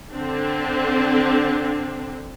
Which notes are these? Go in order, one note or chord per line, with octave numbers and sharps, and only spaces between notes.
D3 C4 D4